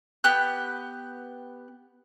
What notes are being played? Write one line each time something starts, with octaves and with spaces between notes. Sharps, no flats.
B3 G4 F#6